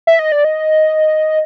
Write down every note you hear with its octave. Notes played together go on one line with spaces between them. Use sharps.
E5
D#5
D5
D#5